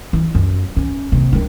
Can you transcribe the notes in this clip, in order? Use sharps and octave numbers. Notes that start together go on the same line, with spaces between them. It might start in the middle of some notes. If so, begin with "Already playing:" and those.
E3
F#2
C#4
F#1 C3
D#3 D4